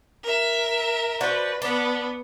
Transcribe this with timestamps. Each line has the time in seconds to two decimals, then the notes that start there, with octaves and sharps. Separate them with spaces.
0.24 A#4 E5
1.21 D4 F#4 B4 C5
1.62 B3 D4